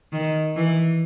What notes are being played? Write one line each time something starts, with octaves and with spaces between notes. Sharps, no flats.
D#3
E3